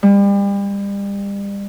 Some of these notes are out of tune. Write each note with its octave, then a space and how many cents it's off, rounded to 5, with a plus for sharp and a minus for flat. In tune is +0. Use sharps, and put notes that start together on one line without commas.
G3 +35